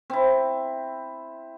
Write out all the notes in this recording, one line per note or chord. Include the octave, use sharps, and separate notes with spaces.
C4 E4